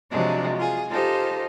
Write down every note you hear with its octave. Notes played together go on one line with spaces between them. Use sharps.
C3 F3 F#3 G#3 D4
F4 G#4
D#4 F4 G4 A4 C5